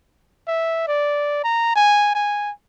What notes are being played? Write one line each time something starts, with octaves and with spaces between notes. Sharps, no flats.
E5
D5
A#5
G#5
G#5